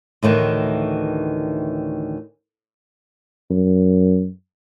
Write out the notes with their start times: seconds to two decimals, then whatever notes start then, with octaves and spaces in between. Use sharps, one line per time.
0.23 D2 A2 D#3 E3
3.50 F#2